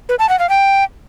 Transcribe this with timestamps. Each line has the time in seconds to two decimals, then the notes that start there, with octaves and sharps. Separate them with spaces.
0.09 B4
0.19 A5
0.29 F#5
0.39 F5
0.49 G5